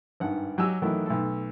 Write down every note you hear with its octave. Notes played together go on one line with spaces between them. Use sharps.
G#1 G2 F#5
F#3 G4 D#5 G#5 E6
D#3 E3 F#3 A3
B1 A3 A4